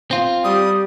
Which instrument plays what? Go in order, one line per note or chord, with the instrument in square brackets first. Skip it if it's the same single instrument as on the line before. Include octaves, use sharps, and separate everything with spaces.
[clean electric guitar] C4 F4
[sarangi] G3 [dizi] D#6